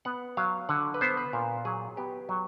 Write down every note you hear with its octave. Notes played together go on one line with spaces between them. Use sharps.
B3 F#5
F#3 F5
D3 F#5
B4
B3 C5
B4
A#2 A#4
F#3 G#4
B3 G4
F#3